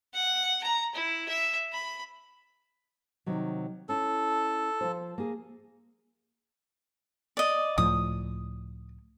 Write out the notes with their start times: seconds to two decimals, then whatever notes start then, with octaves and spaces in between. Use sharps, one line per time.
0.14 F#5
0.63 A#5
0.95 E4
1.28 E5
1.73 B5
3.26 C3 D#3 F#3
3.89 C#4 E4 A4
4.81 F3 F4 C5
5.18 A#3 G#4
7.37 D5 D#5
7.78 C#2 A2 F3 D#6